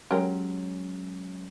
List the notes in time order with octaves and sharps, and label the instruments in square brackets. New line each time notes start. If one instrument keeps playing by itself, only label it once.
[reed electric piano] F#3 G#3 C#4 [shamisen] G4 A#4